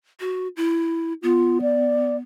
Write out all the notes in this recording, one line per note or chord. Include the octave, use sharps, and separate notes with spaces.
F#4
E4
B3 F4
D5